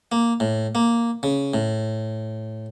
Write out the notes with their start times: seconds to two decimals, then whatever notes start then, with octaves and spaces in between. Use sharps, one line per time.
0.12 A#3
0.40 A2
0.75 A#3
1.23 C#3
1.54 A2